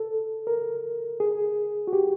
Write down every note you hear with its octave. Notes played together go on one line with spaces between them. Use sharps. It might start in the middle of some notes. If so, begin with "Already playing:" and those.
Already playing: A4
A#4
G#4
F#4
G4